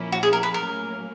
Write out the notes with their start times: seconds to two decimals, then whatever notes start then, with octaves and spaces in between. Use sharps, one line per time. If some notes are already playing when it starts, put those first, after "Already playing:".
Already playing: A#2 F3 A#3 C#4 E4
0.12 F#4
0.23 G#4
0.33 A#4
0.43 B4
0.54 A2 F#3 A#3 C#4 A#4